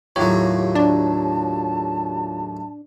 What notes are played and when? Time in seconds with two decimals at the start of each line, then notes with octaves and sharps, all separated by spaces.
0.16 D#2 A2 F#3 F4 G4 C#5
0.75 D4 A5